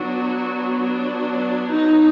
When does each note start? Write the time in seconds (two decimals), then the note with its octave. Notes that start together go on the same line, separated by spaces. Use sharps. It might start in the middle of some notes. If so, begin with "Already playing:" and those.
Already playing: F#3 B3 D4 F#4
0.80 D4
1.72 D#4